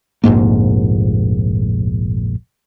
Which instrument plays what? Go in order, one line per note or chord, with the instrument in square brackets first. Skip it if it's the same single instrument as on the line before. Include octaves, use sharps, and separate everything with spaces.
[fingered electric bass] F1 A#1 G#2 A#3